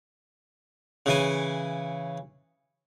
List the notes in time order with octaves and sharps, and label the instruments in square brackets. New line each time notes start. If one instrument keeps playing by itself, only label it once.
[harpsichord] C#3 E3 G#5